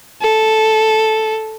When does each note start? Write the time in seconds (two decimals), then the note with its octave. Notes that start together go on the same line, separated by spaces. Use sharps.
0.22 A4